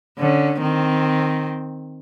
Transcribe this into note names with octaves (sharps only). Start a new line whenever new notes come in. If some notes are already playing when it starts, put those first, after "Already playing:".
D3 C#4
D#3 C4